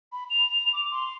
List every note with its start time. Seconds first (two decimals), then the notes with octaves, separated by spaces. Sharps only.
0.12 B5
0.30 F7
0.73 D6
0.91 C6